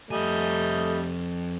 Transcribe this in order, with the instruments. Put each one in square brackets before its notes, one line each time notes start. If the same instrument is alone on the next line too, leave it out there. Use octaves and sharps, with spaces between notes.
[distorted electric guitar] F2 G#5 [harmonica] G3 D#5 [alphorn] A3